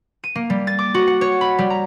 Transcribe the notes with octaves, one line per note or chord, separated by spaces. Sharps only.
D#7
A#3
G3
A6
D6
F#4
F#5
C#5
B5
G3
A#5